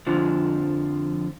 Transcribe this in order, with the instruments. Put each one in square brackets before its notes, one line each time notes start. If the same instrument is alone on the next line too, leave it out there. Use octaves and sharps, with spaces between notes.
[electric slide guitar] F2 D3 F3